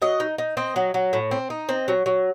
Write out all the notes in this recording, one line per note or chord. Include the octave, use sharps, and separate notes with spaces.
F#3 D#5
D#4
D#4
C4 D#5
F#3
F#3
A2
C4
D#4
C4 D#5
F#3
F#3